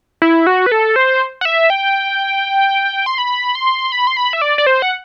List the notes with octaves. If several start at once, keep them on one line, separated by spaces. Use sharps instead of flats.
E4
F#4
B4
A4
C5
F#5
E5
G5
C6
B5
C6
B5
C6
B5
E5
D5
D5
C5
F#5